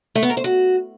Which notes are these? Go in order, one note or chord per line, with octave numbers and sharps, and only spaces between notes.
A3
B3
A#4
C5
F#4